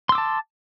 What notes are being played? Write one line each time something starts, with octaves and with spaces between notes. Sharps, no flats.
A5 C6 D6 E6